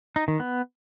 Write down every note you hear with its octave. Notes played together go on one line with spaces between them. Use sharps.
D#4
D#3
B3